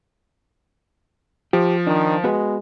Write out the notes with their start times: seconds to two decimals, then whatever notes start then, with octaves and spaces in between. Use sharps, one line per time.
1.53 F3 G4
1.87 D#3 D4
2.24 G#3 B3 F#4 B4